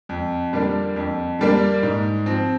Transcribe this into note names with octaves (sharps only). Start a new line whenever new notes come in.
F2
D3 G3 A#3 D4
F2
D3 G3 A#3 D4
G#2
F3 C4